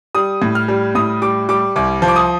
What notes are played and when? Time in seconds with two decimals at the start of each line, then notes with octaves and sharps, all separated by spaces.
0.15 G3 D#6
0.42 A2
0.55 F6
0.68 G3
0.95 A2 D#6
1.22 G3 D6
1.49 G3 D6
1.76 C2 D6
2.02 F3
2.08 D6
2.16 D#6